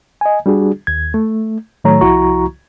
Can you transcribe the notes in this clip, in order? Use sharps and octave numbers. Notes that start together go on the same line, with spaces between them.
D#5 G#5
G3 D4 F#4 G#4
D#2 G#6
A3
A2 D#3 F#3 A3 C#5 A#5
C2 F3 E4 F#4 A#5 C#6